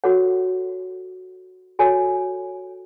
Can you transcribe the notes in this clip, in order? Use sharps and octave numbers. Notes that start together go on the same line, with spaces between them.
F#4 A4 C#5 F#5
F#4 A4 C#5 G#5